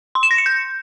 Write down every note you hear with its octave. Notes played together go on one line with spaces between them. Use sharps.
C6
E7
A#6
C#7
G6